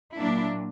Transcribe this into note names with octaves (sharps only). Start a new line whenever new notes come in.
A#2 F#3 A#3 D4 E4